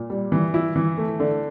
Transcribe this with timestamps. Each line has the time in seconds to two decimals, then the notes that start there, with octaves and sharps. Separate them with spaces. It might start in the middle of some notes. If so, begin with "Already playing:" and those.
Already playing: A#2
0.10 G3
0.32 E3
0.54 E4
0.76 E3
0.98 A3
1.20 D3